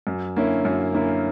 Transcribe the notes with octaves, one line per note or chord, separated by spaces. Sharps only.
F#2
D3 A#3 C#4 E4
F#2
D3 A#3 C#4 E4